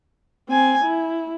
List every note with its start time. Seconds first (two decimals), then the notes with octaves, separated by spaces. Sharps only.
0.49 C4 G#5
0.84 E4